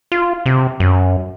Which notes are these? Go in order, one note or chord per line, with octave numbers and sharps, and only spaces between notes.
F4
C3
F#2